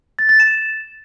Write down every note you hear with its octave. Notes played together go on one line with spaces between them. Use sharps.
A6
A6
E7